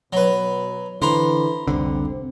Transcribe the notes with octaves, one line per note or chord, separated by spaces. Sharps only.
B2 F#3 B4
D3 E3 C5 A#5 B5
F1 C2 D3 C4